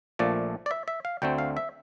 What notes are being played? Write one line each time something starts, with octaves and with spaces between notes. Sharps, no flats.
A#1 A#2 F3 A3 D5
D5
E5
E5
F5
D2 D3 A3 C4 G5
F5
E5